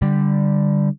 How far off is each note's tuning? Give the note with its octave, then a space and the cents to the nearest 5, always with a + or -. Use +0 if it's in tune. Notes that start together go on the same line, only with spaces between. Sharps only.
D3 +0 G3 +0